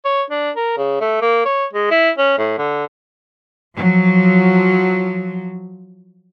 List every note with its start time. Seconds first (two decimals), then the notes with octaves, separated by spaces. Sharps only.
0.05 C#5
0.30 D4
0.56 A#4
0.77 C#3
1.01 A3
1.21 A#3
1.45 C#5
1.73 G#3
1.91 E4
2.18 C#4
2.38 A2
2.58 D3
3.75 F3 F#3